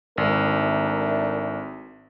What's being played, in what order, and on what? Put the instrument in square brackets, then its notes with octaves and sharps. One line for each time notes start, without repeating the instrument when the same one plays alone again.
[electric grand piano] G#1 [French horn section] A3 D4 A#4